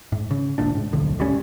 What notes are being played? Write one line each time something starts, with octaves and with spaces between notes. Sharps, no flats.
G#2
C#3
D#1 G#1 A#2 D4
G#2
D1 B1 F2 D3
G1 C#2 G3 C#4